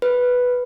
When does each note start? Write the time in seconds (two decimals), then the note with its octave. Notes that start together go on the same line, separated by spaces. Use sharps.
0.02 B4